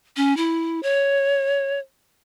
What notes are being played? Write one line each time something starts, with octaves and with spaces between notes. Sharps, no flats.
C#4
E4
C#5